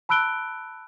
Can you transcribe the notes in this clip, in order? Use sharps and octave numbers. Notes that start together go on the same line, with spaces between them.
A5 B5 E6 F#6 D7 G7